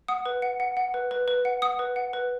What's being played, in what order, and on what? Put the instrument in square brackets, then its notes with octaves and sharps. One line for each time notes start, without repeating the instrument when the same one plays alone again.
[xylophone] F#5 D#6
B4
F#5
F#5
F#5
B4
B4
B4
F#5
F#5 D#6
B4
F#5
B4